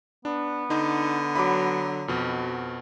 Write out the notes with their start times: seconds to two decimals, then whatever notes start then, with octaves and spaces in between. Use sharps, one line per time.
0.25 B3 D4
0.70 D3 D#4
1.35 F#3 B5 D6
2.08 F2 B2 F#4